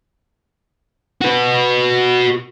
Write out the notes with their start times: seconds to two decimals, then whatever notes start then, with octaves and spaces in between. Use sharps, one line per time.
1.21 F#4 B4